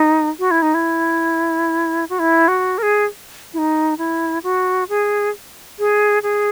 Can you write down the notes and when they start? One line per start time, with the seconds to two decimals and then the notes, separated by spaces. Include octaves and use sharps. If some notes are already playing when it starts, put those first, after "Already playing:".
Already playing: D#4
0.39 F#4
0.51 E4
0.62 D#4
0.74 E4
2.10 F#4
2.19 E4
2.48 F#4
2.78 A#4
2.83 G#4
3.54 E4
3.58 D#4
3.98 E4
4.43 F#4
4.89 G#4
5.79 G#4
6.23 G#4